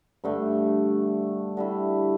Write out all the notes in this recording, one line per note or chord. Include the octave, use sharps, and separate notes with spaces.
G2 D3 A3
D3 G3 E4